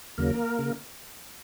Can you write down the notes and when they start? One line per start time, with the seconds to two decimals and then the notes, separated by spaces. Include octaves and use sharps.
0.18 D#2 C#3 F#3 A#3 A#4
0.59 C#3